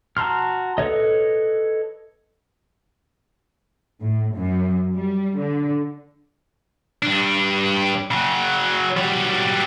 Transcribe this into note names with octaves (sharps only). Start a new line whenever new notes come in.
F#4 A5 A#5 C6 F6
A4 B4 C#5 D#5
A2
F#2
G3
D3
G2 D4
C#3 F#3
F#3 G3